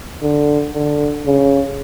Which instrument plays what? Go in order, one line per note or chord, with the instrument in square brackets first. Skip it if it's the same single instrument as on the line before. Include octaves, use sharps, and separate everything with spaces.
[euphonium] D3
D3
C#3